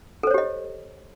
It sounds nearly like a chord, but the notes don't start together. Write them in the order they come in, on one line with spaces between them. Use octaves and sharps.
A4 C5 C#5 G4 D#5